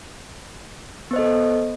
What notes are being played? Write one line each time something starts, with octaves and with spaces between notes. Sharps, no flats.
B3 A4 C5 D#5